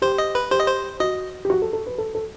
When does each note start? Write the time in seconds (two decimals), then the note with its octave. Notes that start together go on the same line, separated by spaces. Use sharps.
0.02 G4 C5
0.18 D#5
0.35 B4
0.51 G4 C5
0.60 D#5
0.68 C5
1.00 F#4 D#5
1.45 G4
1.50 F#4
1.62 A4
1.73 A4
1.86 B4
1.98 A4
2.15 A4